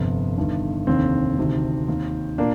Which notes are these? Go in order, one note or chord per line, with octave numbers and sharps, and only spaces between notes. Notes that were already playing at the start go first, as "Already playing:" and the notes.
Already playing: G1 F2 C3
G1 G2 D#3
F1 D#2 D3 C4
D2 C3 D#3
D#2 D#3
A#2 A#3 D4